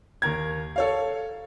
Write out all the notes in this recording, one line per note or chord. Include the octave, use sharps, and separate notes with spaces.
D#2 A#4 G#6
A4 C#5 F5